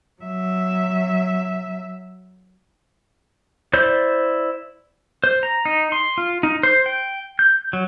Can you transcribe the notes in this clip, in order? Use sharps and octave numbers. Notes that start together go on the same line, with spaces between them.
F#3 E5
E4 C5 D5 G6
C5
A#5
D#4
C6
F4
D#4
C5
G5
G6
F#3